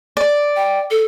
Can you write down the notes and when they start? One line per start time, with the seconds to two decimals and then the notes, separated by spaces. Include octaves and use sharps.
0.17 D5
0.56 G5
0.91 A4